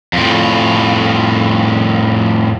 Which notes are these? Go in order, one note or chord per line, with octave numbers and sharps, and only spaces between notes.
F2 A2